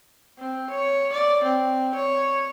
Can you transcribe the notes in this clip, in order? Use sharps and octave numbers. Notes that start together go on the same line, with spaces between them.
C4
C#5
D5
C4
C#5